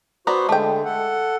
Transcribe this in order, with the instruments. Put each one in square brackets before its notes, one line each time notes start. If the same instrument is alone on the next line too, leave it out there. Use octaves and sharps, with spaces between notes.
[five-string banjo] B3 D5 A#5 [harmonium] F#4 C5
[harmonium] D3 G#3 [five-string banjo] A3 G5
[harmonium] A4 F#5